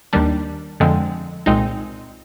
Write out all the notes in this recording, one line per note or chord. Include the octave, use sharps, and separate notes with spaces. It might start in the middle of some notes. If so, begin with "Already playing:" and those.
D#2 D#3 G3 D4
F2 D3 F3 G#3 C4
C2 A#2 G#3 C4 D#4